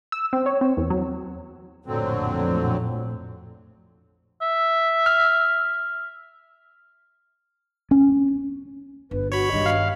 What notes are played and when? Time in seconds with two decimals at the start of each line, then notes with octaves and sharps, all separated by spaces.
0.12 E6
0.33 C4
0.46 C#5
0.61 C4
0.77 E2
0.90 F#3
1.86 A#1 F2 A2 D3 F#3 C4
4.42 E5
5.06 F6
7.91 C#4
9.11 G1 B4
9.32 F#4 C#5 B5
9.52 G2 D#3 D#5
9.66 F5